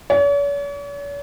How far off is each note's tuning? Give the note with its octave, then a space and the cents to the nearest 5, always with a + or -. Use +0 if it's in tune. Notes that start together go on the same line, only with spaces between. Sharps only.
C#5 +45